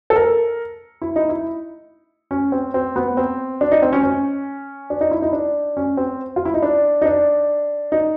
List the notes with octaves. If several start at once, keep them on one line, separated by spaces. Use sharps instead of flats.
A4
A#4
E4
D#4
E4
C#4
C4
C4
B3
C4
D4
D#4
C4
C#4
C#4
D4
D#4
E4
D#4
D4
C#4
C4
F4
E4
D#4
D4
D#4
D4
D#4